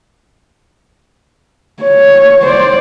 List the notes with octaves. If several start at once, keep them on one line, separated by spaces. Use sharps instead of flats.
C#5
C5 D5